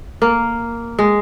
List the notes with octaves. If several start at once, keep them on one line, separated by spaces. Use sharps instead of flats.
A#3
G#3